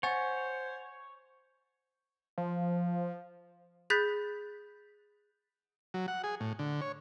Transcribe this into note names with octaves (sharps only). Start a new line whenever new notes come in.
C5 C#5 F#5 G#5 A6
F3
G#4 B5 F#6 G6 A6 B6
F#3
F#5
G#4
A2
D3
C#5